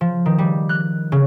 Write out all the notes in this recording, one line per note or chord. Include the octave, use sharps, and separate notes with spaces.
F3
D#3
G3
F#6
C#3